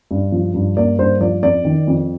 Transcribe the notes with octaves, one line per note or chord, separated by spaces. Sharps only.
G2
F3
G2
A#3 D5
G2 C5
F3 D5
F2 D5
D#3
F2